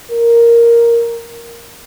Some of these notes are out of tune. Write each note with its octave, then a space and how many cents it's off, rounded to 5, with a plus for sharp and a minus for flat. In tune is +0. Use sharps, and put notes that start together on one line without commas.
A#4 +0